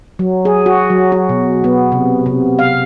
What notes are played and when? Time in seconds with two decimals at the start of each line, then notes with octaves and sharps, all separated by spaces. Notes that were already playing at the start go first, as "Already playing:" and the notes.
0.19 F#3
0.45 G#4
0.66 F#4
0.90 F#3
1.12 F#4
1.29 B2
1.64 B3
1.92 C3
2.26 C3
2.59 F5